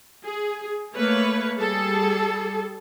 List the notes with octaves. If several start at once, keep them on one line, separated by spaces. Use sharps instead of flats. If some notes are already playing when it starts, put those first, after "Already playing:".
G#4
A3 A#3 B4 C#5
G3 G#4 A4